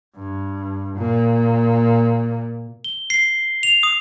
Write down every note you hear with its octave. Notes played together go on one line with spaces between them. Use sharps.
G2
A#2
G7
C7
F7
D#6